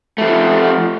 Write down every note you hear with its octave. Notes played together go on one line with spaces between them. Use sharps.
F3 A3